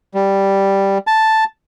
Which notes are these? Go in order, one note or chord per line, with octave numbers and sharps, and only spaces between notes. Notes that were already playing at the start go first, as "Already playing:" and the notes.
G3
A5